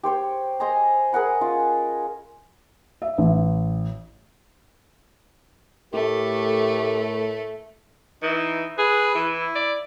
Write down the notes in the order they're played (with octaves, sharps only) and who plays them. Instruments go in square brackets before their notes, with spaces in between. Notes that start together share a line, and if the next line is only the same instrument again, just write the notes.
[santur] G4 C5 C#5 G5
C5 D#5 G#5 A#5
G#4 A#4 F#5 B5
C#4 F4
[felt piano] E5
A1
[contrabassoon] A2 [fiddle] A3 [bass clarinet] G4 [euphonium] A#4
[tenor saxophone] E3 [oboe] D#4
[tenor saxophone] G#4 [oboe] B4
[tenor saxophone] E3
[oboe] E4
[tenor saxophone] D5